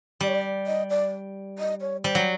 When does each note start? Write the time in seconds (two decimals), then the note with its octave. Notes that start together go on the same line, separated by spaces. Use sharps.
0.21 G3 D5
0.28 C#5
0.35 D5
0.67 D#5
0.90 D5
1.59 D#5
1.81 C#5
2.04 G3 C5
2.15 F#3